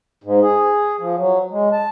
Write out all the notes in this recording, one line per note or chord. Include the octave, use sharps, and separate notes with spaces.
G#2
G#4
F3
F#3
G#3
A5